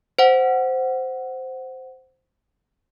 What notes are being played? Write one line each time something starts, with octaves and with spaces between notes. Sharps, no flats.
C5 F#5